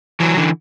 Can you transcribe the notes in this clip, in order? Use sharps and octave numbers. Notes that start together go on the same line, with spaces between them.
E3 F#3
D3 E3